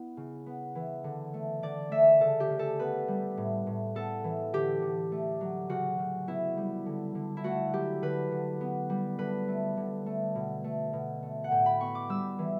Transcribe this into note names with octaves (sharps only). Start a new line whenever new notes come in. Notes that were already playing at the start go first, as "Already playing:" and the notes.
Already playing: B3 E4
C#3
B3
E3
D3
A3
D3 D5
A3 E5
C#3 A4
G4
C#3
A4
B3 B4
G3
A2
A2
B3 A4
E3
D3 G4
D3
A3
F#3
C#3 F#4
C#3
B3 E4
G3
D3
D3
E4
A3 F#4
F#3 G4
D3 B4
D3
B3
G3
D3 B4
A3
D3
A3
B2
A3
B2
A3
F#5
A2 G5
B5
B3 C#6
D6
G3 E6
E3